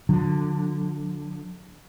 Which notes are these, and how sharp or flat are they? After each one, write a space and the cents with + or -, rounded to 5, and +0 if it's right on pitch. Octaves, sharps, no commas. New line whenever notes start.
D3 +5 F#3 -40